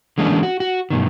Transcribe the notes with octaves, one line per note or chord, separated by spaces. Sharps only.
D3 E3 G#3 A#3 C#4 D4
F#4
F#4
G2 B2 D#3